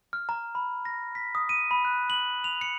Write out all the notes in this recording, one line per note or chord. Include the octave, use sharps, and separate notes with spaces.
F6
A#5
B5
A#6
B6
D#6
D#7
B5
F#6
F#7
F7
C#7